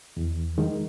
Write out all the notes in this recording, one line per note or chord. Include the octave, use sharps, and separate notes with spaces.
E2
D#3 G#3